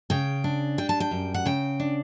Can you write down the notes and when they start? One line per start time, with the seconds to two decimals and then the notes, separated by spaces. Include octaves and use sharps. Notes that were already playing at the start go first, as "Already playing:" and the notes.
0.10 C#3 G5
0.44 D4
0.78 G3 G5
0.89 A5
1.00 G5
1.11 F#2
1.34 F#5
1.45 C#3 G5
1.80 D4